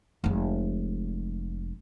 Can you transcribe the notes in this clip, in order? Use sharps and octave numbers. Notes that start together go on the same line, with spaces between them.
F1 G#3